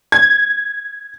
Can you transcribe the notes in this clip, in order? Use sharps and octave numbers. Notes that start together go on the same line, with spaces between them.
G#6